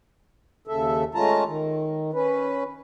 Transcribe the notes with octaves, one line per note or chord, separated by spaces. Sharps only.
D#2 C#3 A4 E5
G#3 A3 C#4 F4 A5 A#5
D#3
C#4 B4